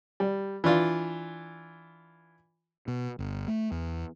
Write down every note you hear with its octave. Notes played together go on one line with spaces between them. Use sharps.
G3
E3 D4 F4
B2
G1
A3
E2